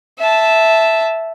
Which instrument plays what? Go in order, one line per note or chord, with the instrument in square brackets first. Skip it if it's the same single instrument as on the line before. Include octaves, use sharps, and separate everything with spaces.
[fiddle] E5 A5